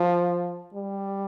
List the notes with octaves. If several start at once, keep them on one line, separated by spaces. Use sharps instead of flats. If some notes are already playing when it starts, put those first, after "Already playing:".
Already playing: F3
G3